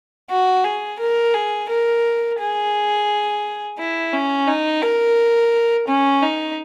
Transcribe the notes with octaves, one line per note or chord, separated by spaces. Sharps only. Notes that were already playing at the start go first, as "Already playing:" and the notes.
F#4
G#4
A#4
G#4
A#4
G#4
E4
C#4
D#4
A#4
C#4
D#4